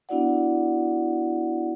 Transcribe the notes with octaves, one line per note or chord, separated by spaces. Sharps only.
B3 D4 E4 F#4 D5 F#5